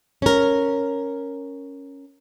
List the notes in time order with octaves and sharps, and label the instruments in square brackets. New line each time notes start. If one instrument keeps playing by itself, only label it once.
[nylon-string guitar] C#4 A#4